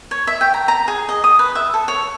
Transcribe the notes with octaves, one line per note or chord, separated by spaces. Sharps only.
C#5
E5
G5
A#5
A#5
G#4
D#5
D#6
B4
E5
A4
C#5